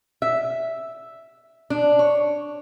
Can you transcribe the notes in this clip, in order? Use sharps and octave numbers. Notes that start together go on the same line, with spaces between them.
E5
D4
C#5